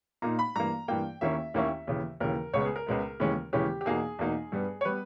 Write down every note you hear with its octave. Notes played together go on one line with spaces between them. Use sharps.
A#2 A#3 D#4 A#5
B5
G2 E3 A#3 A#5
G2 E3 A#3 G5
D#2 D#3 A#3 C#4 E4 E5
D#2 D#3 A#3 C#4 E4
D#2 C#3 E3
D#2 C#3 E3 A#4
C#2 C#3 G#3 B3 C#5
G#4
A#4
C#2 C#3 G#3 B3
D#2 C#3 E3 G#3 C#4
D#2 C#3 E3 G#3 C#4 G4
G4
E2 B2 A#3 D#4 G#4
E2 B2 A#3 D#4
G2 G3 B3
C#5
G3 B3 B4